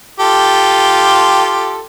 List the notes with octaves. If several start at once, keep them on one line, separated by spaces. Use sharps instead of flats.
F4 G4 A4